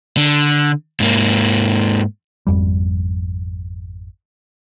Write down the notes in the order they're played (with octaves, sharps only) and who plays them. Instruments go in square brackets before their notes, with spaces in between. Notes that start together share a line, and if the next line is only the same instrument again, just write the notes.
[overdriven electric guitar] D3
G#2 A#3
[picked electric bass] G#1 F2 G3